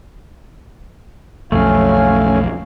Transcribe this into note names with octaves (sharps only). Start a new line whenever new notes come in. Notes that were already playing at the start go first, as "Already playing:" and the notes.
B1 F2 A3 C#4 F5 G#5